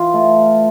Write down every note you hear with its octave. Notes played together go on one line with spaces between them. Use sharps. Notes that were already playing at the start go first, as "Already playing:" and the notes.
Already playing: E3 F4
A3